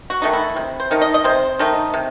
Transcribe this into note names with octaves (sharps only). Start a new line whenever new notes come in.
F#4
D#3 A3 D#4
E4
C3
C5
D#3 A3 D#4
D#5
D#5
C3 C5
D#3 A3 D#4
C3